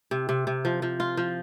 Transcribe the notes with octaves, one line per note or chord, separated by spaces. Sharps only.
C3
C3
C3
F3
F3
F4
F3